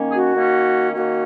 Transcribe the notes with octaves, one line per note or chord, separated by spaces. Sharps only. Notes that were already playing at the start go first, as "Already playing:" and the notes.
Already playing: D#3 A#3 C#4
G#4
F#4
D#3 A#3 C#4
D#3 A#3 C#4 F#4